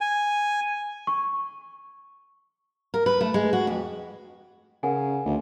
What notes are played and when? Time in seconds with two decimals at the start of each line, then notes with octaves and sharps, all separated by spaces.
0.01 G#5
1.07 C#6
2.94 A#4
3.06 B4
3.21 A3
3.34 G#3
3.53 F#4
3.67 F2
4.83 C#3 A#4 F#5 G#5
5.26 D2